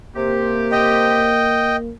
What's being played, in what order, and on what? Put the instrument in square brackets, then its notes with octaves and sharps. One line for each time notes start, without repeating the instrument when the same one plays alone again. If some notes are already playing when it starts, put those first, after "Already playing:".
[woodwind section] C3 G4 [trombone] A#3
[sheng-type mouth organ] D#5 G5